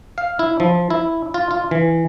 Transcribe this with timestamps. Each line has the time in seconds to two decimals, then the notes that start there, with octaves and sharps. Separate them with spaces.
0.18 F5
0.39 E4
0.60 F3
0.90 E4
1.34 F4
1.51 F4
1.71 E3